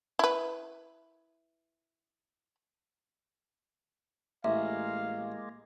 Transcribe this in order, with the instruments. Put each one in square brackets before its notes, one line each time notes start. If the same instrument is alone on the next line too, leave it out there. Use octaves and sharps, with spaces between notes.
[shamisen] E4 B4
[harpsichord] A1 [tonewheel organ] G#3 A#3 [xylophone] E5 [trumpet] F5